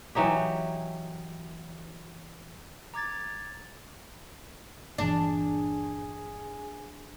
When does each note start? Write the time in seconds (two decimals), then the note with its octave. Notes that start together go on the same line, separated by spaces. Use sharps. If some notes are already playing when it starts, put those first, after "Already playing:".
0.15 E3 F#3 D#4 G4
2.94 A#5 D6 G#6 A6
4.98 G1 A#2 E3 D4 G#4